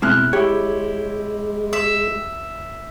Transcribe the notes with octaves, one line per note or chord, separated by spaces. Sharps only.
B2 G#3 C4 E4 F6 F#6
G#3 E4 G4 C#5
E5